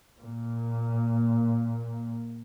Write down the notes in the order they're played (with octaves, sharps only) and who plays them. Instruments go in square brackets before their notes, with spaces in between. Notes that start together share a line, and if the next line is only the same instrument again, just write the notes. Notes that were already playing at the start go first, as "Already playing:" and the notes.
[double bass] A#2 A#3